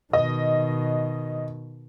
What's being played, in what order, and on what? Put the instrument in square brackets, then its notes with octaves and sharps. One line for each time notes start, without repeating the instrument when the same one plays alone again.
[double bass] B2 D#3 [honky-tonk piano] D#5